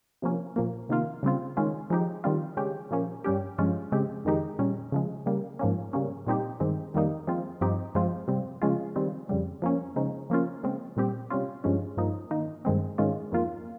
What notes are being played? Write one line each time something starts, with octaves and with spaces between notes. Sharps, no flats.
C3 F3 A#3 C#4
A#2 F3 A#3
C3 D#3 A#3 F4
C#3 G3 C4 F4
D#3 G#3 C#4 F4
F3 G#3 D#4 G4
D#3 G3 C4 F4
C#3 G#3 C#4 G4
A#2 F3 A#3 C#4
G2 G3 C#4 G4
G2 F3 G#3 C#4 F4
C#3 G#3 C4 G4
F2 D#3 G#3 D#4 G4
A#2 G3 C#4
C#3 F3 G#3
C#3 G3 A#3
G#2 F3 A#3 C#4
C#3 G3 A#3 C#4
A#2 G3 C4 D#4 G4
G2 D#3 G#3 C4
F2 D#3 G3 A#3 D#4
F3 G#3 C4 F4
G2 F3 C4 D#4 G4
G2 F3 G#3 C4 F4
C3 G3 C4
C#3 F3 G#3 C#4 F4
D#3 G3 C4
F2 C#3 G3
F3 A#3 C#4
C#3 F3 G#3 D#4
F3 A#3 C#4 F4
C#3 G#3 C4
A#2 G3 C4 G4
C3 G3 C#4 F4
G2 F3 G#3 C#4
G2 F3 A#3 D#4
D#3 A#3 D#4
G2 D#3 G#3 C4
G#2 D#3 G#3 C#4 F4
F2 D#3 A#3 F4